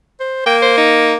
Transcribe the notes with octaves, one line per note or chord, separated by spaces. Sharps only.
C5
A#3 G5
C5
D#4